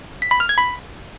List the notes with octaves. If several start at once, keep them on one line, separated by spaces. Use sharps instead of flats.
B6
B5
F6
G#6
B5